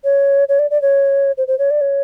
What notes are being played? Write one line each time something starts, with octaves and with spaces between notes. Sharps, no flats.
C#5
C#5
D5
D5
C#5
C5
C5
C#5
D5
C#5